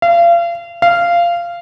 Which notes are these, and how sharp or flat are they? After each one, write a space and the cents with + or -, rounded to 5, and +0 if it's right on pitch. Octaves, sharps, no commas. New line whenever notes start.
F5 -35
F5 -15